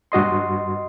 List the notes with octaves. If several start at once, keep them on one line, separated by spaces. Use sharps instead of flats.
G2 F#4 D#5 C6